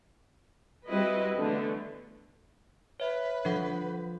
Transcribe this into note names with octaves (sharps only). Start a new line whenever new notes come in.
G3 C4 E4 F#4 B4 D#5
D3 E3 A3 B3
B4 C#5 E5
F3 D4 A4 F#5